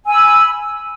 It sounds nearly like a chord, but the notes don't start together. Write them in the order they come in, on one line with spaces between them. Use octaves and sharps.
G#5 E6 B5